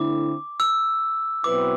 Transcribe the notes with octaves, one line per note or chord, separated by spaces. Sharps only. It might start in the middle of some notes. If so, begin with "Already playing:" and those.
Already playing: D3 A3 C4 E4 D6
E6
B2 F#3 C4 E4 B4 D6